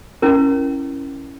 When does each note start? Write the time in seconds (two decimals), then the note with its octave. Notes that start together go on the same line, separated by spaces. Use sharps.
0.22 C#4 E4 A#4